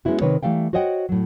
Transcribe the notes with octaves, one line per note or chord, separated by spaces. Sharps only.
G#3 B3 C#4 E4 F#4
C3 D#3 B4 C#5
E3 G3 A3 F5 G5
F#4 C5 C#5 D#5 F#5 G5
A2 F#3